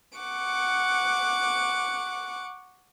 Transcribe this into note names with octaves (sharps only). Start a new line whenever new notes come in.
F#5 C#6 D6